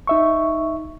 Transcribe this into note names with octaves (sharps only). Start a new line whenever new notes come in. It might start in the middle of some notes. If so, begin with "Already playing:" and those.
D#4 E5 C#6